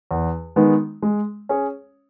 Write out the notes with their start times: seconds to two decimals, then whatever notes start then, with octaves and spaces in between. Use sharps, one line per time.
0.11 E2
0.56 D#3 G#3 B3
1.02 G#3
1.49 C#4 G#4 C#5